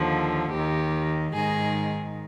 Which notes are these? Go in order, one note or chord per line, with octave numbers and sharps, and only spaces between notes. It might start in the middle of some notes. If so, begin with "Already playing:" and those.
Already playing: D#2 D3 F3
D#2 D#3 G4
G#2 D#3 G#4